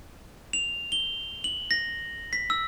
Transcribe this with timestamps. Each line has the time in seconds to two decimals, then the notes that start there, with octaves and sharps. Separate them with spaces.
0.53 F7
0.92 G7
1.44 F#7
1.71 A#6
2.33 B6
2.50 E6